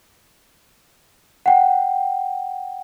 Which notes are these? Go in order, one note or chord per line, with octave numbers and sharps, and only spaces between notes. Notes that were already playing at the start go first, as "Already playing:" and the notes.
F#5 G5